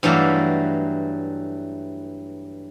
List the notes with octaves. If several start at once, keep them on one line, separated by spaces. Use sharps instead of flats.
G2 E3 F#3 A3 D5 F5